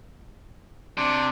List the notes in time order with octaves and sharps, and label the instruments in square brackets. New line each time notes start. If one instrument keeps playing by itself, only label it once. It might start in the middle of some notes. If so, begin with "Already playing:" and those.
[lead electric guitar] C3 [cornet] D4